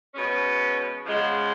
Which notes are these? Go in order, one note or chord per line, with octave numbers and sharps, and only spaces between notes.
B2 G#3 C#4
C#3 F3 G#3 B3